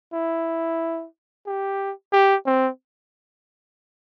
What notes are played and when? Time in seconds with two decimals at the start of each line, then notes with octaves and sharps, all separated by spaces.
0.14 E4
1.46 G4
2.13 G4
2.46 C4